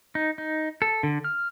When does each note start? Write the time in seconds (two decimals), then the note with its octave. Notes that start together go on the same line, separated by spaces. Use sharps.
0.15 D#4
0.38 D#4
0.82 A4
1.03 D3
1.24 F6